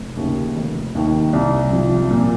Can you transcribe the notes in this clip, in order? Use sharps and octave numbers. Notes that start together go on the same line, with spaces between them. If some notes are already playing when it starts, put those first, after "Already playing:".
Already playing: F1
D#2 C#3
F1
D#2 D#3
C2
C3 F3
A#2